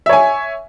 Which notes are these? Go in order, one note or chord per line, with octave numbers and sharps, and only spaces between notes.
C#5 E5 G#5